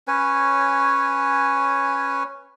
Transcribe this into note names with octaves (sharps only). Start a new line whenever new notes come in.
C#4 B4 C#5 G#5